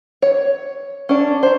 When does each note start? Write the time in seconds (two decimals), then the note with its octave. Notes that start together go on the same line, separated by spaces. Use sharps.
0.22 C#5
1.09 C#4 D4
1.43 C5 A#5